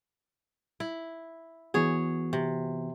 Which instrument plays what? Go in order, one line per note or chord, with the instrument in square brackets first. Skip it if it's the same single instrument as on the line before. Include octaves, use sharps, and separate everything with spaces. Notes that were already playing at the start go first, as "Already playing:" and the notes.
[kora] E4
[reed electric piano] E3 B3 F#4 [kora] G#4 C#5
[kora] C3